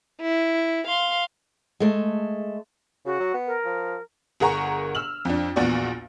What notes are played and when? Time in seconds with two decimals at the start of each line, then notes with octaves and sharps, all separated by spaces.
0.20 E4
0.88 F5 C6
1.80 G#3 A3
3.06 C#3 F#4
3.20 F#3
3.34 B3
3.47 A#4
3.65 F3
4.40 G1 G#4 A#4 F#5 A#5 C#6
4.95 E6 F6 F#7
5.25 F2 D4
5.56 A#1 E2 A#2 B3 F#4 D5